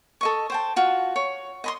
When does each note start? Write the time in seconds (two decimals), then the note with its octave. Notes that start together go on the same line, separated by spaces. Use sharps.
0.21 A4 D#5 C#6
0.50 C5 G5 A5
0.76 F4 F#4
1.16 C#5
1.64 D#5 B5 C6